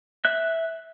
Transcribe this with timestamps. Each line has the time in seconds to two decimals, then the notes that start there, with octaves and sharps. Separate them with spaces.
0.25 E5 F#6